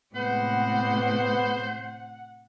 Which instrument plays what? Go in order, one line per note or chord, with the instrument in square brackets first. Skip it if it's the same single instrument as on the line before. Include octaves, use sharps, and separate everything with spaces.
[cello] A2 C3 [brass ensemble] G#3 B3 [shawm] C5 [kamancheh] F#5